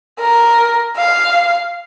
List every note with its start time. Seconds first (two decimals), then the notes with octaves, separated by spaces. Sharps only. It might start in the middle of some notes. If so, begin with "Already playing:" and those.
0.20 A#4
0.97 F5